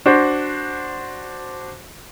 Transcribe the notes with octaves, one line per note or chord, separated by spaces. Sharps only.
D4 F#4 C5